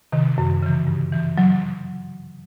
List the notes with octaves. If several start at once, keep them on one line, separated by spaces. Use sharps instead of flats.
C3 D#3
F#2
C#3 E3
G2
E3
F#3